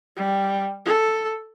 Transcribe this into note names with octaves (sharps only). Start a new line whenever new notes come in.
G3
A4